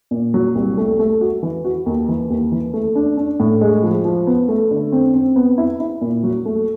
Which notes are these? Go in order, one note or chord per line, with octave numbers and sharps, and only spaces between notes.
A#2
F#3
C2
A3
A3
F#4
E3
F#4
D#2
E3
D#2
E3
A3
D4
D4
A2
G#3
F3
F3
B3
A3
D3
C4
C4
B3
E4
E4
A#2
F#3
A3